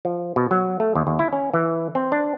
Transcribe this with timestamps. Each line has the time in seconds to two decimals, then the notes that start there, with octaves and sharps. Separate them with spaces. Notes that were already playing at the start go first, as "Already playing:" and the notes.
0.05 F3
0.36 B2
0.51 F#3
0.80 A3
0.95 D#2
1.07 D#2
1.19 E4
1.33 C#4
1.53 E3
1.95 C4
2.12 D4